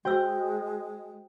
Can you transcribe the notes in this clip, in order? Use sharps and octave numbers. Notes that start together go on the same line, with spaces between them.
G#3 F#4 C5 G5 E6